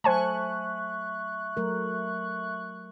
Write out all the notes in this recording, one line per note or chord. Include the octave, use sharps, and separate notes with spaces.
F#3 A3 C5 E5 G#5 A5 C#6 F#6
F#3 A3 A#4